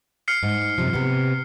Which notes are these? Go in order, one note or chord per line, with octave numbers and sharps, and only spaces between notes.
F6 C7 C#7
G#2
F#2 C3 F3
C3 B3